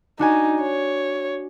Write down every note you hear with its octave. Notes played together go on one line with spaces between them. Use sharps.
D4 D#4 F#4 G#5
C#5